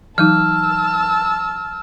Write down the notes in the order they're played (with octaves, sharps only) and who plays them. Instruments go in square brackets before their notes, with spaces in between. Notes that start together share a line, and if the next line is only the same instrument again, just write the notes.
[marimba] E3 F#3 D#4 [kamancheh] A5 E6 [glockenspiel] F6